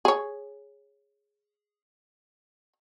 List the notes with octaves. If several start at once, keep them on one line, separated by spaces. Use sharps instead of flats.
G#4 C#5